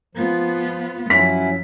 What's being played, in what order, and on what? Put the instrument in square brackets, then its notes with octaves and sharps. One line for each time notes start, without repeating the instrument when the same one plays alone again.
[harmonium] F3 [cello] B3 F4
[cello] F#2 F3 [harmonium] F#3 C#4 E4 [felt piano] B6